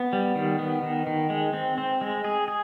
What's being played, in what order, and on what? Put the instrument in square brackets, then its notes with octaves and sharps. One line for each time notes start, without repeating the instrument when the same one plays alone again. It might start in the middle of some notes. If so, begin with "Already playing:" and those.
Already playing: [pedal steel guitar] B3
G3
D#3
B3
D#3
D#3
G#3
C4
C4
G#3
G#4
G#4